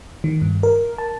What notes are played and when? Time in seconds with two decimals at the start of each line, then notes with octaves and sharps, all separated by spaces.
0.24 D#3
0.42 G2
0.63 A#4
0.98 A5